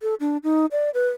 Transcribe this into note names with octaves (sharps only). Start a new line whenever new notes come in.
A4
D4
D#4
D5
B4